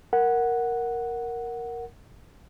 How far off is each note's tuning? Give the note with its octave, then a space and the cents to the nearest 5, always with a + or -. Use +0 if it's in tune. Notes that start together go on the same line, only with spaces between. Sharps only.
A#4 +0 F#5 +0